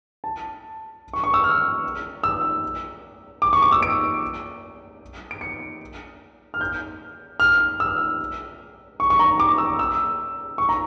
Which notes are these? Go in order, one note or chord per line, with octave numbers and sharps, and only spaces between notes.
A5
C#6
C#6
E6
F6
E6
D6
C#6
D6
E6
D7
D7
C#7
F6
G6
F6
E6
C#6
C#6
A#5
D6
E6
E6
C#6
A#5